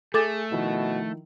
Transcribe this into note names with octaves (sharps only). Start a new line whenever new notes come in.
A3 G#4 A4 D6 A6
B2 D#3 F3 E4